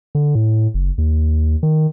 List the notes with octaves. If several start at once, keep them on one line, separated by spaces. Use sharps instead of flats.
D3
A2
F#1
D#2
D#3